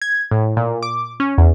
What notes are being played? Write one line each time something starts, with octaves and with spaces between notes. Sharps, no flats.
G#6
A2
A#2
D6
C#4
E2